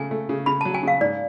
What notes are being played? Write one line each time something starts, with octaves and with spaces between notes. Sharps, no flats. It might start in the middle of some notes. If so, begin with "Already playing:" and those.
Already playing: C#3 A3 G#5
A3
C#3
C#3 B5
F#3 A5
G#5
C#3 F5
G#2 D5